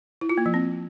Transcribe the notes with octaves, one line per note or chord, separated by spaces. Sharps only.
E4
F4
A#3
F3
C4